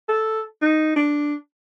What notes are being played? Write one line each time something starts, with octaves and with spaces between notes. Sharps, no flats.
A4
D#4
D4